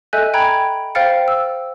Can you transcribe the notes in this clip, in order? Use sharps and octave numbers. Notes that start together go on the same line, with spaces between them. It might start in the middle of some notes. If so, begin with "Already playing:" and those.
A4 D#5 E5 G#5 F#6 G6
G5 A#5 B5 G#6
C5 F5 G5 F6 A6 C#7
E6